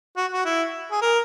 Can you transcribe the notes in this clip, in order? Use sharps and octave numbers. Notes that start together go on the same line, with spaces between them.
F#4
F#4
E4
G#4
A#4